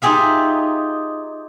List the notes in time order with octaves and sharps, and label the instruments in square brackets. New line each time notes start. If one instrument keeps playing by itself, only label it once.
[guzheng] D#4 F4 G4 G#4 E5 F5